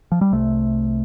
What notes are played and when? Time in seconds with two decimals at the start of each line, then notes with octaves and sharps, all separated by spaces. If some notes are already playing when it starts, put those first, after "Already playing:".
0.12 F3
0.21 G3
0.31 C2 C3 A3